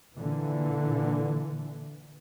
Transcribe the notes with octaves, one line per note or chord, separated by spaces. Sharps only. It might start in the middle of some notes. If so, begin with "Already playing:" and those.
A#2 D3 E3